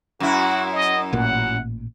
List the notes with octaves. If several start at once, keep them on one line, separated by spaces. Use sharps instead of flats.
F#2 E4 F#4
D#5
A1 A#2 F#5